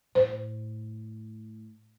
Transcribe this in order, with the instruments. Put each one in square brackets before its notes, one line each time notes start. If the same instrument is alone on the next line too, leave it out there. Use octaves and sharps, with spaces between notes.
[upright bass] A2 [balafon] C5